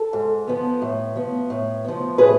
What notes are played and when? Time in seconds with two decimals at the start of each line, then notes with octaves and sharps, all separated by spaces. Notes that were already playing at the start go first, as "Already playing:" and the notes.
Already playing: A4
0.13 G#2
0.48 F3 B3
0.82 A2
1.16 F3 B3
1.50 A2
1.85 F3 B3
2.18 A2 G#4 B4